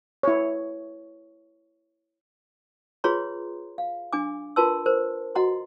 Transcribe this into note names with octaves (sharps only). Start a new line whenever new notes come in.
E4 C#5
F4 G#4 B4 C#5 A#5 C6
F5
D4 G#5 D6
F4 A#4 B4 A5 C6 E6
A#4 C5
F#4 D#5 F#5 A#5 C6